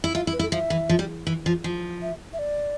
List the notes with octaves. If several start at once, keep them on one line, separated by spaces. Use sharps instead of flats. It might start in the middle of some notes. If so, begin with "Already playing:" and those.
E4
F4 E5
E4
B4
E4
A4
F3 E5
E3
F3
G3
E3
F3
F3
E5
E5
D5